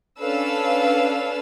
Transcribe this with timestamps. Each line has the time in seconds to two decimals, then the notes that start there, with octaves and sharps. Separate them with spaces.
0.19 C#4 D4 A4 B4 F5 E6